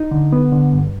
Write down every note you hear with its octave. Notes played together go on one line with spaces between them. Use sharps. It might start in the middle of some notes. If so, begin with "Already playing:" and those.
Already playing: D#4
D3
B3
D3
G2